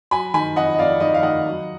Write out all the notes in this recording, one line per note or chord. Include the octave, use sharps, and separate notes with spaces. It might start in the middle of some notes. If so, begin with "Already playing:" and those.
F#3 G#5 B5
D#3 G#5 B5
F2 D#5 F#5
D#5
F2 D5 F5
D#3 D#5
F5
D#3 D#5 F#5
F#3